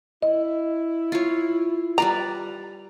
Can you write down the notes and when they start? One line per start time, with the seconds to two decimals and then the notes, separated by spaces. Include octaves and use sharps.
0.22 E4 D#5
1.12 F4 C#5
1.98 G3 B4 D5 A#5